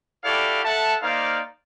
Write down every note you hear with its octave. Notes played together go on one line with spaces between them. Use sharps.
E4 F#4 G4 A4 D5 F5
A4 E5 F#5 A5
A#3 D#4 C5 D5 F5